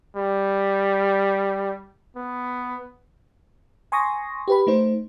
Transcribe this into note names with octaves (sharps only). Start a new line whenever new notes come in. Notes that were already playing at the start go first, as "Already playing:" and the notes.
G3
B3
G#5 C6 C#6 D#6 A#6
G4 B4 B5
A3 D#4 C5